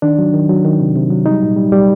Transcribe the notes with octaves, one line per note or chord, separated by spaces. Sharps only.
D#3 D4
F#3
D#3
F#3
D#3
C3
C3
F#3
G3 D#4
A#2
G3
G3